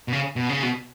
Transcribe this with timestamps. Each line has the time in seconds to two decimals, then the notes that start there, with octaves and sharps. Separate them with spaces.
0.08 B2
0.13 C#3
0.36 B2
0.49 C#3
0.63 B2